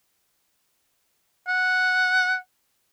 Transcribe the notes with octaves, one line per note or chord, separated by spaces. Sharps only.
F#5